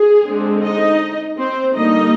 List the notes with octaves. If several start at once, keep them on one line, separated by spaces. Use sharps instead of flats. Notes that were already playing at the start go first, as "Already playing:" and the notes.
Already playing: G#4
D3 G#3 C4
D#4 D#5
C4 C5
D3 G3 A#3 D#4 D#5